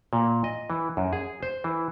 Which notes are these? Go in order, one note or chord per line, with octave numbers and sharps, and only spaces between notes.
A#2
D#5
E3
F#2
G#4
C5
E3